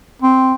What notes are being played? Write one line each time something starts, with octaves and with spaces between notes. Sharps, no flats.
C4